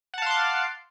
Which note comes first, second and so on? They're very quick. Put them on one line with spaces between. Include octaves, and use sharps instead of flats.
F#5 A5 F5 C6 D6